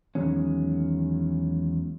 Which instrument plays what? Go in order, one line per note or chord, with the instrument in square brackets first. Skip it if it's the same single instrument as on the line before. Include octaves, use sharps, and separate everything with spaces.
[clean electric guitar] E2 D#3 F#3 G#3 C#4